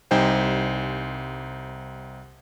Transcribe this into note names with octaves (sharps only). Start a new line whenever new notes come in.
C2 G3 D#4 C5 G5 G#5